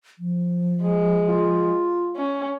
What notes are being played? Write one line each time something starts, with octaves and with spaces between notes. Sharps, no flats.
F3
G#3
F4
C#4